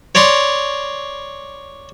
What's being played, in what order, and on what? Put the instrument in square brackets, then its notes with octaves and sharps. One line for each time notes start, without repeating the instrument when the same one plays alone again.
[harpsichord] C#5 D5 A#5 C6 C#6